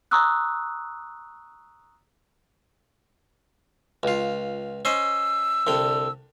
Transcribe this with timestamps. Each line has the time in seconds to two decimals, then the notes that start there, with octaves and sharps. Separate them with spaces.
0.11 A#5 C#6 D#6 E6 F#6
4.03 C#2 F4
4.85 C#4 C5 D#5 E6
5.67 C2 D3 G5